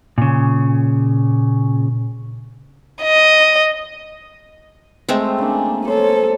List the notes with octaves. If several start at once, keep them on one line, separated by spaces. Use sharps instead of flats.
A#2 C#3
D#5
G#3 A3 C4
C#3 A#3 D4
A4 C5 C#5